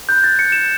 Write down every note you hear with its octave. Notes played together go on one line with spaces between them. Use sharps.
B5 F#6 G6
A6
C#7
E7